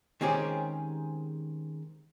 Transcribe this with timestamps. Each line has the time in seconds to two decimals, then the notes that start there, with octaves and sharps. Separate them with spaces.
0.21 D#3 G#3 C4 C#4 G4 G#4